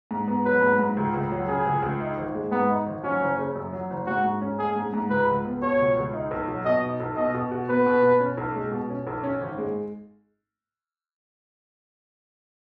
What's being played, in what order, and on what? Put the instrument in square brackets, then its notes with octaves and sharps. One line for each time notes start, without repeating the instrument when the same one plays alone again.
[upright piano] G#2
B3
[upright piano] F#3 [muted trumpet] B4
[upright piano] G#2
G#2
C#2
C#2
F#3
[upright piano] C#3 [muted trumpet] G#4
[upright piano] C#2
C#2
D#4
G#1
G#3
[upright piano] G#2 [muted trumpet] B3
[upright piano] D#4
G#1
[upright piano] F#3 [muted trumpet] C#4
[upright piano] F#1
C#3
F#2
F#3
F#1
[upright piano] G#2 [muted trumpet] F#4
[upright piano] G#2
C#4
[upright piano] G#3 [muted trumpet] G#4
[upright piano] G#2
G#2
[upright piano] C#2 [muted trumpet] B4
[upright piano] C#2
B3
[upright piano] B2 [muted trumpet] C#5
[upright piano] C#2
C#2
D#4
B1
F#3
[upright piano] B2 [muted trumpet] D#5
[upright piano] D#4
B1
[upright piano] B2 [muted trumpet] D#5
[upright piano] B2
F#4
[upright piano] B3 [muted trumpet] B4
[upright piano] B2
B2
C#4
B1
G#3
B2
C#4
B1
C#4
G#1
G#3